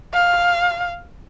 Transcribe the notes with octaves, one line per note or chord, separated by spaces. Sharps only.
F5